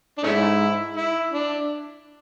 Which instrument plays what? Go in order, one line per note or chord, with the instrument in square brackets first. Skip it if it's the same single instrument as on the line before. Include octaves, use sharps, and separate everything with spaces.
[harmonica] D4
[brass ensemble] G#2 [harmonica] A3 C#4 E4
[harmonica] E4
D4